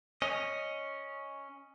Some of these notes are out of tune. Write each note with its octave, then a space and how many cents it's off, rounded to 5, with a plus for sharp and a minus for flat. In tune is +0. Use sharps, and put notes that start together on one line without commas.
C#4 +0 D#5 +0